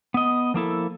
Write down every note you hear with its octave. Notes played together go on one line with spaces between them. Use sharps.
B3 D#5
F3 A#3 E4 A4